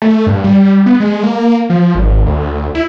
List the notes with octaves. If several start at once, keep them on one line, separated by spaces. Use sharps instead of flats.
A3
G2
G3
B3
G#3
A#3
F3
G#1
D2
E4